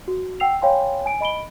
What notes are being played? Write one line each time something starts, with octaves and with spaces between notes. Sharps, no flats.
F#4
F#5 G5 E6 C7 F7
C#5 F5 G5 G#5 B5 C6
G#5 D7
D#5 B5 D7 G7